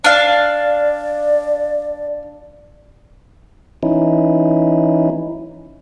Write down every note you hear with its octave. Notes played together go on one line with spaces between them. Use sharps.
D4 D5 F5
E3 C#4 D#4 E4